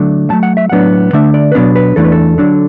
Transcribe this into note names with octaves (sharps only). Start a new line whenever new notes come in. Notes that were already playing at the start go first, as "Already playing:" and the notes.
Already playing: D3 F#3 A3 D4
A2 F#3 A3 A5
F#5
E5
A2 F#3 B3 D4 F#5
D3 A3 D4 E5
D5
B4
B2 F#3 B3 D4 D5
B4
E2 E3 A3 D4 A4
B4
A4
D3 F#3 D4